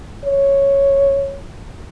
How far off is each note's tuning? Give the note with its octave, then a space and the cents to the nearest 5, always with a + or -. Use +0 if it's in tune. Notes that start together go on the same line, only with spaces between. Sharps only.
C#5 -5